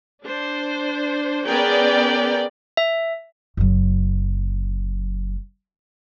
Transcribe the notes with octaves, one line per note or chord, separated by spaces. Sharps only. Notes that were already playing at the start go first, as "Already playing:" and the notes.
D4 C5
B3 C#4 G#4 A#4 D5 G5
E5
F#1 F#3